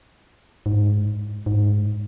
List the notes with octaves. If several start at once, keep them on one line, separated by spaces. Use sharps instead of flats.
G#2
G#2